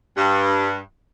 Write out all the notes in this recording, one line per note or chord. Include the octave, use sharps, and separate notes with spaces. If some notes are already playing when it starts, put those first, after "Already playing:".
G2